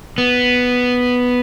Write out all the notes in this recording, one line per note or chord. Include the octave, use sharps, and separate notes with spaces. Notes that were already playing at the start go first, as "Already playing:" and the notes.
B3